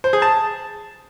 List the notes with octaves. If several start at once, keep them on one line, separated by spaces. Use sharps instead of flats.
C5
G#4
A5